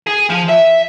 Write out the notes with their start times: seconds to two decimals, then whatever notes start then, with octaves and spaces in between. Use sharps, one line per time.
0.07 G#4
0.30 F3
0.49 E5